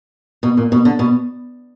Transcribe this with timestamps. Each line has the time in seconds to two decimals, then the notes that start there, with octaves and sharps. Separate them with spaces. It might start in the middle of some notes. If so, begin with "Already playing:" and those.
0.43 B2
0.57 A#2
0.72 B2
0.85 D3
0.99 B2